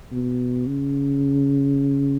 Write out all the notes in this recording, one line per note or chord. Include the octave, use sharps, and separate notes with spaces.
B2
C#3